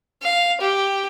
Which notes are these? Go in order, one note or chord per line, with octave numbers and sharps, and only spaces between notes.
F5
G4